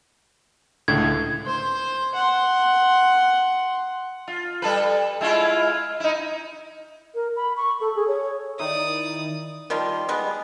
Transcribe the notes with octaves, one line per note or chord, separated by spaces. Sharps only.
C#2 A2 D3 G#6
C5
F#5 C6
F4
G3 A4 B4
G#3 E4 F4
D#4 E4
A#4
B5
C#6
A4
G#4
C#5
D#3 D#4 E4 D5 D#6
D#3 F3 G3 F4
G3 G#3 B3